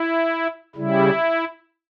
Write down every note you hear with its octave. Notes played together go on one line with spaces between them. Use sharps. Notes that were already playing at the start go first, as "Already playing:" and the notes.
Already playing: E4
C#3 G3 E4